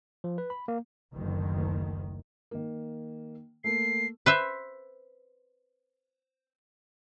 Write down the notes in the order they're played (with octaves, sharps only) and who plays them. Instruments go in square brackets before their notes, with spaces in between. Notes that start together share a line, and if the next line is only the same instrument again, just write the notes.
[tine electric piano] F3
B4
B5
A#3
[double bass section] F#1 D2 D#3
[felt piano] D#3 A#3
[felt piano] A3 A#3 [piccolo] C7
[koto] B4 C5 E5